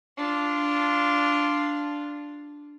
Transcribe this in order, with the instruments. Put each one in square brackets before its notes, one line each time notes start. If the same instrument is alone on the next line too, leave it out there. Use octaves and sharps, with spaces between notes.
[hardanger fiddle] D4 F4